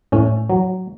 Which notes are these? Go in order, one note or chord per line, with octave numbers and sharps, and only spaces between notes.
A2 C#4
F#3